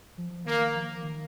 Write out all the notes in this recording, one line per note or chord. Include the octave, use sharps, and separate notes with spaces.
F3
D#3 A#3
F3
D#3